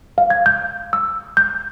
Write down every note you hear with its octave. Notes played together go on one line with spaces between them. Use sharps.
F5
G#6
G6
E6
G6